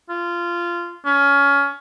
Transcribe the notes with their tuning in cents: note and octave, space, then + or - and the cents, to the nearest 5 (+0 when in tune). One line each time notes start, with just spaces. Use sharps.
F4 -15
C#4 +20